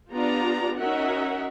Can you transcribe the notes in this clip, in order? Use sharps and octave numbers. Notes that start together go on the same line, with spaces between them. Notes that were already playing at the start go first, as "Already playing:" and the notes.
B3 D4 F4 G4 D5 A#5
C#4 D#4 F#4 A#4 E5 F#5